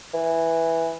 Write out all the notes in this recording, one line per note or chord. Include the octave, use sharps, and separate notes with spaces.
E3